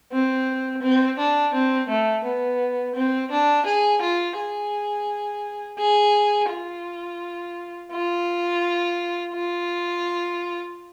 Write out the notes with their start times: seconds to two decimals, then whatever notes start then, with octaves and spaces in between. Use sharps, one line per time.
0.12 C4
0.82 C4
1.18 D4
1.54 C4
1.89 A3
2.24 B3
2.95 C4
3.31 D4
3.66 G#4
4.02 F4
4.37 G#4
5.78 G#4
6.50 F4
7.92 F4
9.33 F4